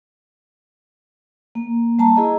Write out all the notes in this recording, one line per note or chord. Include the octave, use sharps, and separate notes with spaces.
A#3
G3 A5 A#5
E4 G#4 D#5